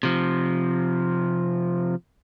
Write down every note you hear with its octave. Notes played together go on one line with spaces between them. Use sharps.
C3 F3